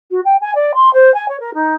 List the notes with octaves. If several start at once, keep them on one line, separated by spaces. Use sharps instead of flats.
F#4
G5
G#5
D5
C6
C5
G#5
C#5
A#4
D#4